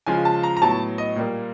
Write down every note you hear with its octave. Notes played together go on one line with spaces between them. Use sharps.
C#3 F3 G#3 G#5
A5
A#5
A#5
A2 F#3 B3 A5
D#5
A#2 G3 A#3